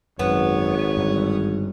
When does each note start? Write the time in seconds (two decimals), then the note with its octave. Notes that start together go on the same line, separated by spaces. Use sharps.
0.19 G#1 F#2 B3 C#5
0.97 G2 D3